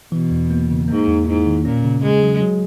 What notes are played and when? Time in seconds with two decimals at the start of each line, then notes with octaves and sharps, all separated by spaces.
0.12 B2 E3
0.31 E2
0.51 A#3
0.69 C#3
0.88 G#2 A#3
1.07 E2
1.26 G#2 E4
1.46 D#3
1.65 A#2 C#4
1.84 C#3
2.03 C#3 G#3
2.22 F#3
2.41 F#3